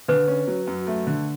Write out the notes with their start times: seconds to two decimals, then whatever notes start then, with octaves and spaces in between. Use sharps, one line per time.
0.08 D3 B4
0.28 C#4
0.47 F#3
0.67 F#2
0.87 A3
1.07 D3